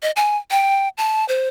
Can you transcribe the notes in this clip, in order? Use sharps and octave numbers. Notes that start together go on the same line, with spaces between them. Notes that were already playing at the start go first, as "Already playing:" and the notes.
D#5
G#5
G5
A5
C5